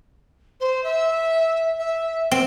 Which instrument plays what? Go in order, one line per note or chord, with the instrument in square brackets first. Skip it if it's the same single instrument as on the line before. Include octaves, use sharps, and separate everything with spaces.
[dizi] C5
E5
E5
[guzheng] C4